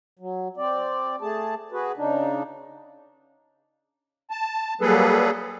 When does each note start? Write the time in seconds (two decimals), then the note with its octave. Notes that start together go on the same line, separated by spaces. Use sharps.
0.19 F#3
0.57 C4 D5
1.22 A3 G#4 A5
1.72 F#4 G#4 B4
1.97 C#3 D4 D#4
4.30 A5
4.81 F#3 G3 A#3 G#4 A4 B4